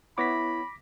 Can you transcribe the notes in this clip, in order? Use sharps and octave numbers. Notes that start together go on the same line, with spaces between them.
B3 E4 C#5 F#5 B5 D6 A#6 B6